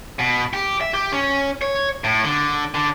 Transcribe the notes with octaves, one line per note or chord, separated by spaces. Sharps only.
B2
G4
E5
G4
C#4
C#5
A2
D3
D3